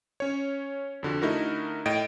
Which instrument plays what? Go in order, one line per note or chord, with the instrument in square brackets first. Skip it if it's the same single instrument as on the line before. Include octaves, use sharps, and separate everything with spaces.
[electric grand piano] C#4 C#5
F2 D3 F#4
D3 A3 D#4 E4 F#4 A#4
A2 D#5 G5 D7